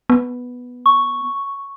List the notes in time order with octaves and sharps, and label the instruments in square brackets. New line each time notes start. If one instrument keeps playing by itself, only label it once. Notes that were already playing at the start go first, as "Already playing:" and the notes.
[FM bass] B3
[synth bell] C#6